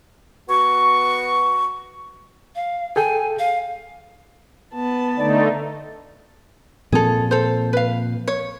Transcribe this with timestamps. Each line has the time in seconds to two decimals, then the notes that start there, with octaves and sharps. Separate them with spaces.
0.48 B3 F#4 C#6
2.55 F5
2.96 G#4 A4 G5 G#5
3.39 F5
4.74 B3 A5
5.18 D3 A3 D#4 D5
6.92 A#2 F3 C4 G#4 A4
7.31 A4 C5
7.73 B4 F5
8.28 C#5